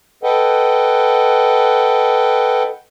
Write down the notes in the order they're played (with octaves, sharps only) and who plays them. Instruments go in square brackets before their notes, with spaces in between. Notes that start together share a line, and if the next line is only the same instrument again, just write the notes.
[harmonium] A4 B4 D#5 F#5 G5